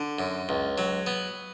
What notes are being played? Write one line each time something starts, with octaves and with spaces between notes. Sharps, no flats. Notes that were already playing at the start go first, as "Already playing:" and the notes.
Already playing: D3
F#2
C#2
F#3
B3